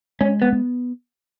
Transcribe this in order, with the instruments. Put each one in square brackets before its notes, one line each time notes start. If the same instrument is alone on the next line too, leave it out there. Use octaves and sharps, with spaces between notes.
[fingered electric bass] G#3 [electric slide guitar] C#4
[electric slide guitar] B3
[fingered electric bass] B3